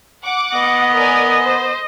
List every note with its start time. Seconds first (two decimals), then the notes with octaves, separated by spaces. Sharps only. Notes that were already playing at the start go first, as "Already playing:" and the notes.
0.22 F#5 D6
0.55 B3 D#5
0.95 A#4 D5 G#5
1.41 C5